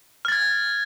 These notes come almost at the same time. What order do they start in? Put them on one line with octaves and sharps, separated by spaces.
F6 A6 G#6